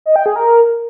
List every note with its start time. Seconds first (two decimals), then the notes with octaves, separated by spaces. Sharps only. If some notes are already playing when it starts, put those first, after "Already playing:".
0.06 D#5
0.16 G5
0.26 G#4
0.36 A#4